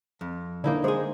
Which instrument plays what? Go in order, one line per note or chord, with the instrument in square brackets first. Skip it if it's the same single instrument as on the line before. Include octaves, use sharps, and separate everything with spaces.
[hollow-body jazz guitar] F2
[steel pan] D3 [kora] A#3 D#4 E4
[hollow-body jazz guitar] G#3 G#4 [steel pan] C5